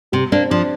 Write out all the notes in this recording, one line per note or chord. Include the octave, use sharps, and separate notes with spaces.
C3 G3
A#3 C4 D4
F3 D4